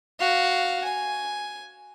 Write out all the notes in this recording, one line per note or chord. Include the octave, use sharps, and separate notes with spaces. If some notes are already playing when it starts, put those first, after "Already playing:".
F#4 F5
G#5